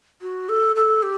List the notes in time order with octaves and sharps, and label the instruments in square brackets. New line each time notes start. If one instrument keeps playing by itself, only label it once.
[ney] F#4
A4
A4
G4